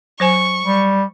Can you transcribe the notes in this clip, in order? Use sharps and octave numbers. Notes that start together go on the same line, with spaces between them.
F#3 C5 G#5 C#6
G3